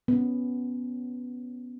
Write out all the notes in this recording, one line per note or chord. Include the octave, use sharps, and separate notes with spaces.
B3 C#4